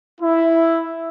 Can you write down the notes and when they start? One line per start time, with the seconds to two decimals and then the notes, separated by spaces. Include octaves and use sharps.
0.21 E4